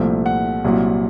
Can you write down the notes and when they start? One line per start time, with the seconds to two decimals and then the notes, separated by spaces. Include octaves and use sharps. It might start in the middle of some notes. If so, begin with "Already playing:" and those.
Already playing: C2 A#2 F3 A3
0.26 F#5
0.64 C2 A#2 F#3